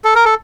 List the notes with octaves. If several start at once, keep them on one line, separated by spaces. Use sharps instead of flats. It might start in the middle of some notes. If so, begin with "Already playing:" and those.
A4
A#4
A4